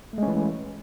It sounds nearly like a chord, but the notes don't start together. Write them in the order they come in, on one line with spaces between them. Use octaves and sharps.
A3 G#3 C#4 E3